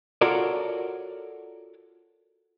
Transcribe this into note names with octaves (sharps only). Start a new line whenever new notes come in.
F4 F#4 A4 A#4 C#5 D5